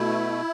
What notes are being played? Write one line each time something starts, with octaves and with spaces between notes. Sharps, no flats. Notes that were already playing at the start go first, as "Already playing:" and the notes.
Already playing: B2 A3 E4